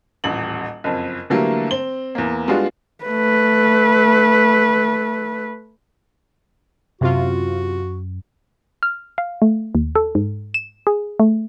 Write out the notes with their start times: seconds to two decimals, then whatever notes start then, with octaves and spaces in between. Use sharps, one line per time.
0.24 D#1 A1 F#7
0.84 F#1 F2
1.30 D3 E3 F#3 G3 A3 A#3
1.71 C4 G7
2.15 E2 A#3
2.48 G3 G#3 B3 D4 F4 F#4
3.05 A3 B4
7.01 F#2 C3 F4 F#4
8.83 F6
9.18 F5
9.42 A3
9.75 D#2
9.95 A4
10.15 G#2
10.54 E7
10.87 G#4
11.20 A3